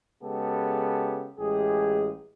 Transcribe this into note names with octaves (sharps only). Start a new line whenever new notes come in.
C#3 G#3 B3 G4 A4
A1 G#3 G4 G#4